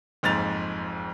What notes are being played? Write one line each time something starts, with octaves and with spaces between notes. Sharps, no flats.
F#1 F2 G#2 A6 F7